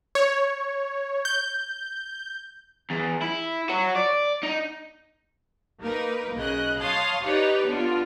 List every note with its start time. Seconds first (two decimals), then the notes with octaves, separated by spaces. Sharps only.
0.15 C#5
1.25 G6
2.90 E2
3.22 E4
3.69 F#4 C#5
3.95 D5
4.43 D#4
5.81 A#3 D#4 A#4 B4
6.36 B1 C#3 D#5 F#6
6.81 C#5 F5 A5 C6 D#6
7.24 D#4 G4 B4 C#5 D5
7.67 D3 B3 F4